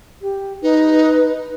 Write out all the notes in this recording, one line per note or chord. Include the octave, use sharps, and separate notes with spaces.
G4
D#4 B4